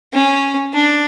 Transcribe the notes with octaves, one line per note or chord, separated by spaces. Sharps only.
C#4
D4